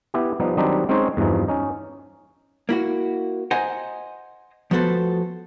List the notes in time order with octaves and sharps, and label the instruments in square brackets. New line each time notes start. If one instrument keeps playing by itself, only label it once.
[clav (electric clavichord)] B3 E4 G4
F3 G3 B3 D#4
D#3 F#3 G3 C4 D4 D#4
G#3 C4 C#4 D#4 C5 C#5
E2 G2 E3 F3 D#4
C#4 D#4
[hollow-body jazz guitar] A#3 E4 F#4
C5 D#5 F#5 G#5 A#5
F3 A3 B3 F#4 A4 C5